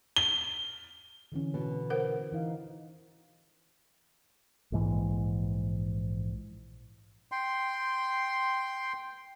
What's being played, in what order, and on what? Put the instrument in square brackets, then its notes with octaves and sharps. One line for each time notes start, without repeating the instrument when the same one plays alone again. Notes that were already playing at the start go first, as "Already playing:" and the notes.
[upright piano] G7
[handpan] D3 E3 C#4
[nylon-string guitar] B2
[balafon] A#4 C5 F#5
[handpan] E3 D#4 F5
[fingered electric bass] A#1 G#2 E3
[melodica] G5 C6